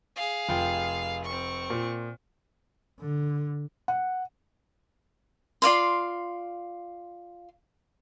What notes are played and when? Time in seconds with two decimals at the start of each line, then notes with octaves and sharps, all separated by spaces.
0.16 G#4 F5
0.49 F1 F4 G5
1.25 C4 C#6
1.70 A#2
3.00 D3
3.88 F#5
5.62 F4 D5 F5 C6